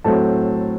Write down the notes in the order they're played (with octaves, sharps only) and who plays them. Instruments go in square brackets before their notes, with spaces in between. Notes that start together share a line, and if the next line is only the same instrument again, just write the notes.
[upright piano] A2 F#3 A3 C4 A5